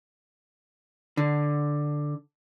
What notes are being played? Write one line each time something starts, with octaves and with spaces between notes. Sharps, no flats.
D3